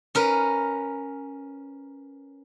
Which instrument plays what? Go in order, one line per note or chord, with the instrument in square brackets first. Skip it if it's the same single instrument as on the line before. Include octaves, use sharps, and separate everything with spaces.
[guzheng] C#4 A#4 B4